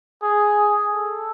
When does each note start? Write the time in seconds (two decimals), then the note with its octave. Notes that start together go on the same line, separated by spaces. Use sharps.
0.23 G#4
0.93 A4